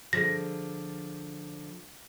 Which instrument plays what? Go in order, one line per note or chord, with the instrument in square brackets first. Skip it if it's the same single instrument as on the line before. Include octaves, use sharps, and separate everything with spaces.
[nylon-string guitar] D3 F3 G#4 [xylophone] A#6